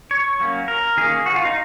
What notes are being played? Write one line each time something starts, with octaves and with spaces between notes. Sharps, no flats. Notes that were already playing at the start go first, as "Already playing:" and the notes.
C#5
F#3 A#3 C#4
A#4
D#3 A#3 C#4 G#4
F#4
F4
D#4